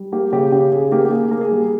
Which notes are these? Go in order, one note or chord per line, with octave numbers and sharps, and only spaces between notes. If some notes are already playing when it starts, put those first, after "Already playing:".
Already playing: G3
A#3 G4
C#3 G4
C#3 G4
C#3 G#4
A#3 G4
G4
A#3 G#4
A#3 A#4
G#4
G3